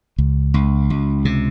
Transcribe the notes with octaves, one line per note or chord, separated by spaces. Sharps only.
C#2
C#2
C#2
C3